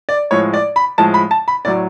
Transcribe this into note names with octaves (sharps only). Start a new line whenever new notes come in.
D5
A2 F3 G#3 C#5
D5
B5
A2 F3 G#3 A5
B5
A5
B5
A2 F#3 D5